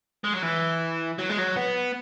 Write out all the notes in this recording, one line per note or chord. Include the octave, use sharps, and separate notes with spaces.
G#3
F#3
E3
F#3
G#3
F#3
B3